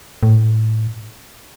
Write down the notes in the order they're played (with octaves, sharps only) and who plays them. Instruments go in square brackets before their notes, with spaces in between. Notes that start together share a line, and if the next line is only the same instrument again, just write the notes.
[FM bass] A2